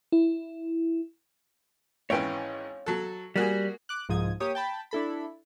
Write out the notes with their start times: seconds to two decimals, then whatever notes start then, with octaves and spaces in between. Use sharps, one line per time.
0.12 E4
2.10 G#1 E3 C#4 C#5 F5 G5
2.86 F#3 A4
3.36 G3 A#3 F#4 G#4
3.89 D6 F#6
4.09 C2 G#2 F3 D#6 G#6
4.40 A#3 G4 C#5 D#6
4.55 G5 A5 B5
4.91 D4 E4 A4 B5